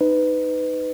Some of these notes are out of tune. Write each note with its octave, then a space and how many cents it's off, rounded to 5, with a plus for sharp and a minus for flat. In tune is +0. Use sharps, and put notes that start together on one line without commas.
D#4 -5 B4 +20